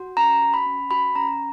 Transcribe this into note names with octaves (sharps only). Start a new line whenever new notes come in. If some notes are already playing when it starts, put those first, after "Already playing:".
Already playing: F#4
C#4 A#5
F#4
B5
C#4
F#4 B5
C#4 A#5